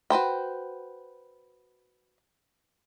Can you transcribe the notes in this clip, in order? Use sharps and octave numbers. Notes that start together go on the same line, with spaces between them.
F#4 B4 C5 G5